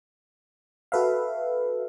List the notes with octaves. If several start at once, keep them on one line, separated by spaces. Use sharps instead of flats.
F#4 A4 B4 E5 F5